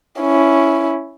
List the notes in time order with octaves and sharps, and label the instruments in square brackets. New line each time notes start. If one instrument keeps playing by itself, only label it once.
[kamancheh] C#4 E4